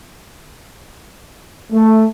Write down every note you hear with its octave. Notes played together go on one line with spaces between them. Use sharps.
A3